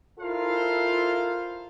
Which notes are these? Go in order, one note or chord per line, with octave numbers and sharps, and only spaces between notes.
E4 F4 A4 A#4 C5 F5